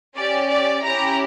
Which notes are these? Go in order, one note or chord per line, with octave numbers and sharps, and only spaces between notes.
C#4 G4 D5
D5
C#4 E4 G4 A#5